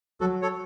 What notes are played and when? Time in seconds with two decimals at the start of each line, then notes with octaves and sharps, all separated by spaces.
0.20 F#3 F#4 A4
0.42 A4 C#5